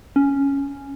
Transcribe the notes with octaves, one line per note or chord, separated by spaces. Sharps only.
C#4